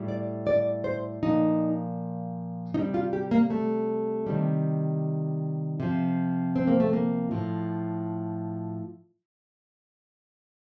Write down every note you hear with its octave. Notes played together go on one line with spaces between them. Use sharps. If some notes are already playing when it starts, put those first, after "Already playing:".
Already playing: A2 G3
D5
D5
C5
A#2 F3 D#4
C3 G3 D#4
F4
G4
A#3
A3
C3 D#3 G3
C3 F3
C4
A#3
A3
A#3
A2 F3